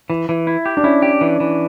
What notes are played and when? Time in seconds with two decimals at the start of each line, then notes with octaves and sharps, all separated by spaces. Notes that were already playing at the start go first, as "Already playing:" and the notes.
0.10 E3
0.29 E3
0.47 E4
0.66 G4
0.77 D4
0.84 C#4 E4
1.02 G4
1.21 E3
1.40 E3